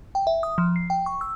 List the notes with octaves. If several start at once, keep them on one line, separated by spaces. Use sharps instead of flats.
G5
E5
D#6
F3
C7
G5
C#6
E6